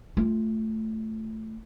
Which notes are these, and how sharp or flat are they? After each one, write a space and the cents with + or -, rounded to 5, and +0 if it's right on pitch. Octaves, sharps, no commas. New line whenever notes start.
A3 +0 F4 -10